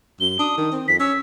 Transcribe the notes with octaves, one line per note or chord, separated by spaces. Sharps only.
F#2 G7
D4 D#6
D#3
C4
F2 B6
C#4 E6